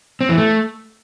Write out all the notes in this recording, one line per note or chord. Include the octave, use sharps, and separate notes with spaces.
C4
E3
A3